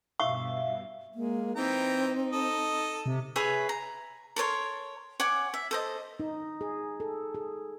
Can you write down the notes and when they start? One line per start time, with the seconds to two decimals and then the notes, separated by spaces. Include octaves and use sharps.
0.20 G2 B2 E5 F5 C#6
1.15 G#3 A#3
1.56 E3 C4 D#4 G5 A#5
2.33 A4 D#5
3.06 C3 C4
3.36 G#4 B4 C#5 E5
3.69 A#5
4.36 A4 A#4 C#5 C6
5.20 C#5 F#5 G#5 D6
5.54 E5
5.71 A4 C5 D#5
6.20 D#4
6.61 G#4
7.00 A4
7.34 G#4